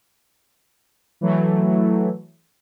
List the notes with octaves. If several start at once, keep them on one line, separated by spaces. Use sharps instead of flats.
E3 F#3 A3